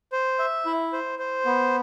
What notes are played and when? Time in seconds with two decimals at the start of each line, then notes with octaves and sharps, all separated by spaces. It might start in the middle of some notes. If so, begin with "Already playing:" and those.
0.12 C5
0.39 E5
0.66 E4
0.93 C5
1.19 C5
1.46 B3